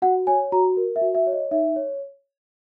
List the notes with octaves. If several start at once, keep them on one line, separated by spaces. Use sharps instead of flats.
F#4 F#5
C#5 G#5
F#4 A#5
A#4
E5
F#4
E5
C#5
D#5
D#4 E5
C#5